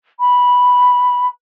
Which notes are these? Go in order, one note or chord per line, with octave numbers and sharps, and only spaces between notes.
B5